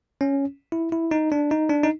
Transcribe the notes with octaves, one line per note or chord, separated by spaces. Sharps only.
C#4
E4
E4
D#4
D4
D#4
D4
D#4